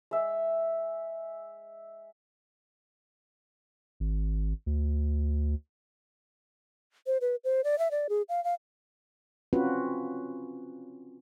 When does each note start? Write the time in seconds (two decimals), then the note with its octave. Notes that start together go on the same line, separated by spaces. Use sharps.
0.11 G#3 E5
4.00 G#1
4.66 D2
7.07 C5
7.21 B4
7.44 C5
7.64 D5
7.79 E5
7.91 D5
8.09 G#4
8.29 F5
8.44 F5
9.53 C4 C#4 F4 F#4 B4